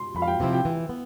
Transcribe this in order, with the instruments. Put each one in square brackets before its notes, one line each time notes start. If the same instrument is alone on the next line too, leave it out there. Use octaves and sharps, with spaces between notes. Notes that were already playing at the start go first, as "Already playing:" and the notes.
Already playing: [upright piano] C6
[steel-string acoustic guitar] F2 [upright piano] B5
[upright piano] F5
G5
[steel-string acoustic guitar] C3 F3 C4 E4
[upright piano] G5
[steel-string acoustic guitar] E3
B3